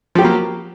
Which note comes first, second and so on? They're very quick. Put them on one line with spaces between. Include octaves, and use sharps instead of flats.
F3 G4 F#3 A#3